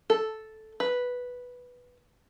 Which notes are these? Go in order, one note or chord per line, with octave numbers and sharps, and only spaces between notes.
A4
B4